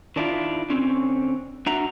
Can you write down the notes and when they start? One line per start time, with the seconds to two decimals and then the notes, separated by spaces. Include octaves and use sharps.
0.16 D#3 D4 E4 F4
0.70 D3 C4 C#4
1.66 D4 F#4 E5 F#5 A#5